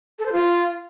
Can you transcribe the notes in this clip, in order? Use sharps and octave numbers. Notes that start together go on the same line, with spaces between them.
A4
C5
F4